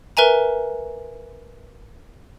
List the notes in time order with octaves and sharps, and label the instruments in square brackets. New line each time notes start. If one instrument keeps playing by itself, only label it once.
[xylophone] A#4 B4 E5 G#5 A#5